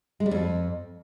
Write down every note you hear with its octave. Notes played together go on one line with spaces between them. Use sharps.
G#3
G3
F2